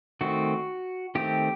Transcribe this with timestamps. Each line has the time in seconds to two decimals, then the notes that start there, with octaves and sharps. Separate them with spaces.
0.21 D#3 A3 C4 F#4
1.15 D#3 A3 C4 G4